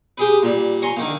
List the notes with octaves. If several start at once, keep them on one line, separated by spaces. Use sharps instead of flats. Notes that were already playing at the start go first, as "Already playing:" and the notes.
G4 G#4 B4
A#2 G3
C#5 G#5 A#5 C6
D3 D#3 A#3